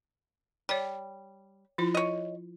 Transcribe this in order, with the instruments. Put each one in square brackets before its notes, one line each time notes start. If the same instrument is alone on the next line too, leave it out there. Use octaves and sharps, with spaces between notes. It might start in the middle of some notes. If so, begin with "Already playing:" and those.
[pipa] G3 [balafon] C#5 G5
[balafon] F3 E4 F4
[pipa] C#5 D#5